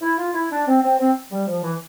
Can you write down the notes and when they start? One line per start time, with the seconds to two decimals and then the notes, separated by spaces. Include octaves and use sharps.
0.02 E4
0.19 F4
0.34 E4
0.51 D4
0.67 C4
0.83 C4
0.99 C4
1.32 G3
1.48 F3
1.64 E3